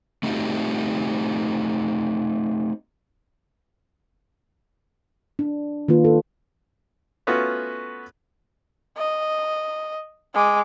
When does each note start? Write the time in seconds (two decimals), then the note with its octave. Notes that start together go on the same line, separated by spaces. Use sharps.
0.23 A3 C4 D#4 E4 F#4 G4
5.39 D4
5.88 D#3 A#3 F4 B4
6.05 A4
7.27 A3 B3 C#4 F4 F#4
8.97 D#5
10.34 G#3 D6